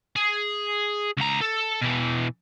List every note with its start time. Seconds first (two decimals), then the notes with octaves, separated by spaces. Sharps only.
0.16 G#4
1.17 C#2 A#5
1.41 A4
1.82 B2 E3